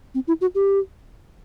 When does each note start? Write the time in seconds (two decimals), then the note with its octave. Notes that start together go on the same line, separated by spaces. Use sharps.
0.14 C4
0.27 E4
0.41 F#4
0.55 G4